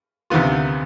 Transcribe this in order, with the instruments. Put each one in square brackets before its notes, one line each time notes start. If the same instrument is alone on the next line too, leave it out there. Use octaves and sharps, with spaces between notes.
[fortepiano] D2 C3 D#3 B3 F4